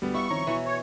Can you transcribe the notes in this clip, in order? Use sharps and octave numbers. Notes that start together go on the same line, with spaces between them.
D2 G3 B3
E4 E5 F5 C#6
D#3 F3 C4 C#5 A#5
B2 E3 D#7
C#5